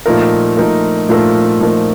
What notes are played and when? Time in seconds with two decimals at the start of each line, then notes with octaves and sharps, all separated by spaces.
0.06 A#2 F3 A3 D#4 A#4
0.57 A#2 F3 A3 D#4 A#4
1.09 A#2 F3 A3 D#4 A#4
1.61 A#2 F3 A3 D#4 A#4